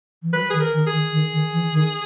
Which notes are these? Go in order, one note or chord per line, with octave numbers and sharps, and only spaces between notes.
E3
F#3 B4
D#3 G#4
A#4
D#3
G#4
D#3
D#3
D#3
E3
D#3